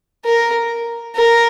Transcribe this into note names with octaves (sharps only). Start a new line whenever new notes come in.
A#4
A#4